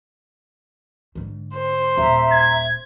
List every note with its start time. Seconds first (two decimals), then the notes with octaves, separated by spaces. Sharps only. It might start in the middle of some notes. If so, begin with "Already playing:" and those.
1.15 G#2 D3
1.55 C5
1.98 D#1 E5 A#5
2.32 G#6